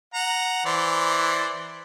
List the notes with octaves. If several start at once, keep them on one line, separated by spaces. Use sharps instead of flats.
F#5 A#5
E3 C5 D5